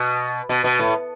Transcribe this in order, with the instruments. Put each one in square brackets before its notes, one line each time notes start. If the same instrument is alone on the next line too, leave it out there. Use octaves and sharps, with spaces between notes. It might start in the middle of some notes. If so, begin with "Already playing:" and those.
Already playing: [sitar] B2
B2
B2
A2